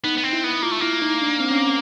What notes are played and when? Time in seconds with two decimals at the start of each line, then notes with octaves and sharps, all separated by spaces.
0.04 B3 D#4
0.18 B3
0.24 C4 D#4
0.33 E4
0.44 B3
0.62 A#3 F4
0.71 A3
0.81 A#3 E4
1.02 D#4
1.22 D4
1.40 C4
1.51 C#4